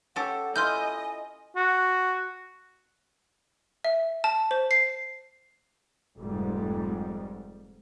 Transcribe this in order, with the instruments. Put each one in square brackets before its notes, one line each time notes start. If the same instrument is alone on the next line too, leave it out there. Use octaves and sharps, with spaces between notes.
[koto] C#4 G4 A4 [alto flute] F#5
[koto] E4 F4 [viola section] D#5 [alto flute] G#5 [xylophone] C6 F6 G6
[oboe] F#4
[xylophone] E5
A5
C5
C7
[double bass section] F1 F2 G#2 G3